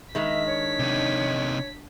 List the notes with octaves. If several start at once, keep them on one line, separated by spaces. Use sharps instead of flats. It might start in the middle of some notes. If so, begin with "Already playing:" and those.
D#3 G#3 D4 E5 B6
C#5
C3 D#4